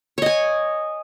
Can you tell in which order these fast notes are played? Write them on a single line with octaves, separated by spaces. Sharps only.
C#5 D#5 G#5